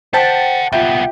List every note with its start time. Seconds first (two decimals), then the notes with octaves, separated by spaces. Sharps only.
0.14 A4 C5 F#5 G5 A5 B6
0.73 C2 B3 F4 G4 E5